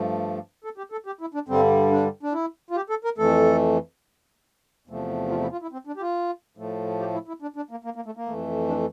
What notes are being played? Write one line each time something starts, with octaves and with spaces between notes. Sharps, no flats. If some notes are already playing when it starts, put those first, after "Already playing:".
Already playing: G2 F3 A3
A4
G4
A4
G4
E4
D4
G2 D3 G3 C4
D4
D4
E4
F4
G4
A4
A#4
F2 E3 A3 A4
E2 C3 F3 A3
F4
E4
F4
E4
C4
D4
G4
F4
A2 F3 A3
G4
E4
E4
D4
D4
A#3
A#3
A#3
A3
A#3
F2 E3 A3
D4